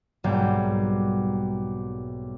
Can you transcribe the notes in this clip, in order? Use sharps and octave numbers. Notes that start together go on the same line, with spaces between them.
B1 G#2 G3 A#3 G6